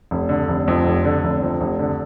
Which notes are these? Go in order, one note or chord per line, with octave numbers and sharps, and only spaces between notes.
F1
D3
F1
F2
F1
D3
F1
F2
F1
D3